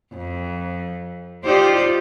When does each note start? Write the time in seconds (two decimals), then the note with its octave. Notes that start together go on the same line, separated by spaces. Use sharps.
0.14 F2
1.45 D#4 F4 G4 C5 D5